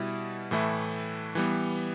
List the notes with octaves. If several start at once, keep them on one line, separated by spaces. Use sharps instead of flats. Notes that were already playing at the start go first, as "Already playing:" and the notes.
Already playing: B2 G3 E4
A2 E3 A3 E4
E3 G3 B3